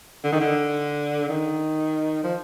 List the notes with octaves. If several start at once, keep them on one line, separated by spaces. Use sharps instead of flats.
D3
D#3
D3
D#3
F3